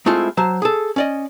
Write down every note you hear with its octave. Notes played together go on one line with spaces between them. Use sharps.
G#3 A3 C4 E4 F4
F#3 C5 A5
G#4 A4
C#4 D5 D#5